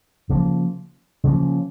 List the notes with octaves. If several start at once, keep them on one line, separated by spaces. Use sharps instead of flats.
C#3 F3 A#3
C#3 F3 A#3